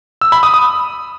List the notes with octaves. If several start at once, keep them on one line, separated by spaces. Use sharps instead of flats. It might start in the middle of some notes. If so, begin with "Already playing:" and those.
E6
B5
D#6
D#6